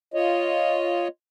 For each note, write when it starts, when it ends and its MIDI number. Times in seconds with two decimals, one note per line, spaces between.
0.14 1.08 65
0.14 1.08 73
0.14 1.08 75